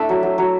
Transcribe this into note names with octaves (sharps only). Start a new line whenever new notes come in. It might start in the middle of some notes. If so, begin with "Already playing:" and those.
Already playing: A3 D4 E4 D5 E5
F#3
F#3
F#3